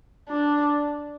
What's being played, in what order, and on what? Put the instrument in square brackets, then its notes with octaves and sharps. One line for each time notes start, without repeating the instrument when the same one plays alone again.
[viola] D4